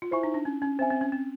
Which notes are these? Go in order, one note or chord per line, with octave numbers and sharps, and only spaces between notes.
F4
E4 C5 E5 G#5 C#6
D#4
D4
C#4
C#4
C4 C5 E5 G#5
C4
C#4
C4